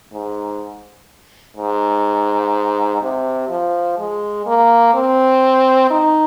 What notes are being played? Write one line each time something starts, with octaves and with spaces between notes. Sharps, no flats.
G#2
G#2
C3
F3
G#3
A#3
C4
D#4